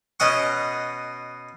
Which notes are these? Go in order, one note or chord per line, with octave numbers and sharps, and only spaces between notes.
B2 C#4 D#5 F#5 C#6